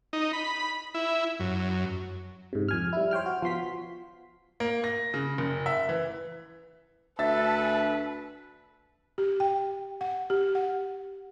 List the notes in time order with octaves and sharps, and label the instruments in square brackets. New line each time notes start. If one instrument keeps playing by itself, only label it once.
[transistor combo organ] D#4
B5
E4
F#2
[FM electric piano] G#2 C3
F2 G#5 F6
G3 E4
C5 C#5 G5 F6
F#4
F3 B3 C6 B6
[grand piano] A#3
A#6
C#3
F#1
E5
E3
[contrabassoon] D2 [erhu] A4 [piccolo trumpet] B4 [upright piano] E5 A6
[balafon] G4
G5
F#5
G4
F#5